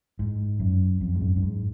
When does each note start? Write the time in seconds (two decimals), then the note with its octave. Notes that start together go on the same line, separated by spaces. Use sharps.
0.19 G#2
0.60 F#2
1.01 F2
1.15 G#2
1.21 F#2
1.36 F#2
1.42 G#2